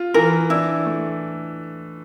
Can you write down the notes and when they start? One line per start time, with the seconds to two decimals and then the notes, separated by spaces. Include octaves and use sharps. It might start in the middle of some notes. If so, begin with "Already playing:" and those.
Already playing: F4
0.14 E3 A#4
0.50 D4 E4
0.86 A3